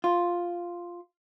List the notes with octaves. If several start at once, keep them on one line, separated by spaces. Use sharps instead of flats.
F4